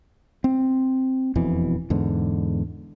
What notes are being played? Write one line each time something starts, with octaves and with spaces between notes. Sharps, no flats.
C4
E1 F2 B2 E3
E2 G#2 D3